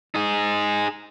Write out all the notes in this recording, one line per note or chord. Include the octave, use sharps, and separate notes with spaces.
D#4 G#4